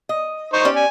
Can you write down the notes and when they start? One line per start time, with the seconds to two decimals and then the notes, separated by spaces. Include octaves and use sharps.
0.09 D#5
0.53 D#4 C5 C#6
0.65 C#4 G4 D5
0.76 G#5